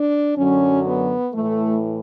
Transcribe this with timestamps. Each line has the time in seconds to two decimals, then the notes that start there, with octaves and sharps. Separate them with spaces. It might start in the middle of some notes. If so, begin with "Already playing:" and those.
Already playing: D4
0.36 F#2 D3 F#3 C#4
0.85 B3
1.34 A2 E3 A3